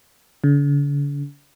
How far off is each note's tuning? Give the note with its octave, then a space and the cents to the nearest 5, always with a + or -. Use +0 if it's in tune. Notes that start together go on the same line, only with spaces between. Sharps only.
D3 -45